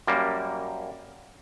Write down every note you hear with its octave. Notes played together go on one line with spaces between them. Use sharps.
F#2 G3 A#3